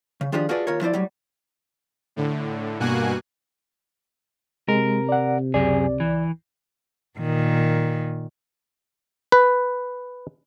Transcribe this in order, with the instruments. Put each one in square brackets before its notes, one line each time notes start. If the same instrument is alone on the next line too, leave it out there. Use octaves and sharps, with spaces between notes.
[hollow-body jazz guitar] C#3
D#3 F3 D4 F4 G4 G#4
F4 F#4 G#4 A4 B4 D5
D#2 F4 A#4 C#5
F3 E4 C5 D5
A2 F#3 G3
[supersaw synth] A2 D3
G2 B2 A#3 F#4 G#5 F#6
[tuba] C3 [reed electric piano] G#3 [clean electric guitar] A#4
[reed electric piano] D5 F#5
[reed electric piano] C#2 D5 [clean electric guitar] F#2 G#4
[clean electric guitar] E3
[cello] A#2 D#3
[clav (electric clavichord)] B4